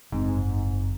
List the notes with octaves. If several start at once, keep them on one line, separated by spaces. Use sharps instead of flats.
F#1 G#2 C4